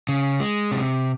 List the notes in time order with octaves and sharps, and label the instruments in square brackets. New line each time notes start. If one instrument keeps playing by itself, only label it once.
[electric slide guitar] C#3
G#3
C3